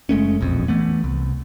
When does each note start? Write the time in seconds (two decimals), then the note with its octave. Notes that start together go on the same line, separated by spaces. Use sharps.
0.09 F#1 G#3 A3 C#4
0.41 E1 A#1 F2
0.68 E3 A3 B3
1.04 C2